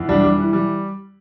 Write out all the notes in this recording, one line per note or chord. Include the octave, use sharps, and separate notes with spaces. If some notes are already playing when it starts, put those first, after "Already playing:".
Already playing: E2
G3 D4
G3
E3
G3